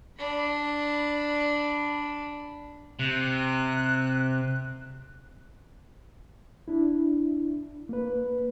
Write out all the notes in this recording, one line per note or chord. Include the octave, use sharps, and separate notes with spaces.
D4 B5
C3 F#6
D4 E4
A#3 B4